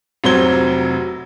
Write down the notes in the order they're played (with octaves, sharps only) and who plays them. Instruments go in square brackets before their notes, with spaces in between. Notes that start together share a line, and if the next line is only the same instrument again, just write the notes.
[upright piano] F1 C3 F#3 C5 G#6 G7